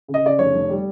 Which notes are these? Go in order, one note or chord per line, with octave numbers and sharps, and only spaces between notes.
C#3
D#5
C#3 D5
F1 C#5
F1
G3